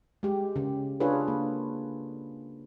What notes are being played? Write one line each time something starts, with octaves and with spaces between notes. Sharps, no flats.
G#3 G4
C#3
D4 F4 G#4 A4 B4 C#5
A#3